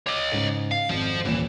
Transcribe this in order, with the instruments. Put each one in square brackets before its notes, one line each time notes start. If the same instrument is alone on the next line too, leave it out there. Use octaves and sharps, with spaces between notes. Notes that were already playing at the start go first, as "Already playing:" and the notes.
[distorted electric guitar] C#5 D#5 [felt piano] D6
[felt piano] G#2 C#3
[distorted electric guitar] F5
[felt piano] G#1 F2 [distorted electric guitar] F3 C5
[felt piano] D#1 A#2 E7 [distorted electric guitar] E3